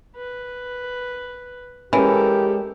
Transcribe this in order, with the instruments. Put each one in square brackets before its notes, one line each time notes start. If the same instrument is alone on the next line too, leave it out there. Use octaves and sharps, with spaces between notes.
[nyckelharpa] B4
[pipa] E3 [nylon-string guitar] G#3 C#4 [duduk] G4 [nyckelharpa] A4 A#4